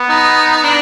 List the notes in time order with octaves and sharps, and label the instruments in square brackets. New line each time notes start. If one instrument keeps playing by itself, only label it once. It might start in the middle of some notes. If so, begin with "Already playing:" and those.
Already playing: [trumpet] B3
[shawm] D#4
D4